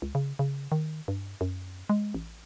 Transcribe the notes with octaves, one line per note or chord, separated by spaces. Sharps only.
C#2
C#3
C#3
D#3
G2
F#2
G#3
A1